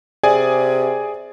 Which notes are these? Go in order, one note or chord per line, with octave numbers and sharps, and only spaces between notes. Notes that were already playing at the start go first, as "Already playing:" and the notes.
C3 G#4 D5 G#5